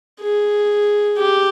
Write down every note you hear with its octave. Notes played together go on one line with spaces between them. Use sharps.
G#4
G4